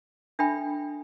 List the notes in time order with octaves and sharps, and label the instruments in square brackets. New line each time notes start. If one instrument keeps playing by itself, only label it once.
[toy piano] D4 A4 E5 G5 B5